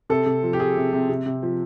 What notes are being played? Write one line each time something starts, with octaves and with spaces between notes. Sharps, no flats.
C3 A4
C3
F3
G4
F3 G#4
C3
C3
C3
C3
F3